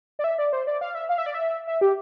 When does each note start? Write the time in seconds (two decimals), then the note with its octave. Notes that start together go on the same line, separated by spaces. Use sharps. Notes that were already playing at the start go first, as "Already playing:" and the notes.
0.19 D5
0.24 E5
0.38 D5
0.53 C5
0.67 D5
0.81 F5
0.95 E5
1.09 F5
1.18 E5
1.26 D5
1.34 E5
1.67 E5
1.81 G4